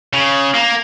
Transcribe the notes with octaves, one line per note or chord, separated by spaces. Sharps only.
C#3
A#3